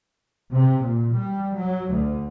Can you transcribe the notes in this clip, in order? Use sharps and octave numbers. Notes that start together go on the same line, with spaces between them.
C3
A#2
G3
F#3
D2